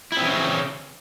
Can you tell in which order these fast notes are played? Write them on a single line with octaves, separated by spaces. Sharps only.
E4 C4 E3 C#4 C#3